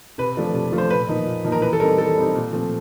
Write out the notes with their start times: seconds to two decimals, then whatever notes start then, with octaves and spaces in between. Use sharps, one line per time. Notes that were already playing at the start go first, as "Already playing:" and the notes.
0.18 C3 B4
0.37 F3 A3 D4 F4
0.54 C3
0.72 F3 A3 D4 F4
0.78 C5
0.90 A#2 B4
1.09 F3 A#3 D#4
1.27 A#2
1.44 F3 A#3 D#4
1.52 A#4
1.62 E3 B4
1.73 A4
1.80 G3 C4 D#4 A#4
1.98 E3 A4
2.16 G3 C4 D#4
2.34 A#2
2.52 F3 A3 C4